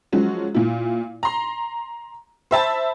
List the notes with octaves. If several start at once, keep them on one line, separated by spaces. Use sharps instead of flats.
F3 F#3 G#3 C#4 F#4
A#2 E4
A#5 C6
C5 E5 A5 B5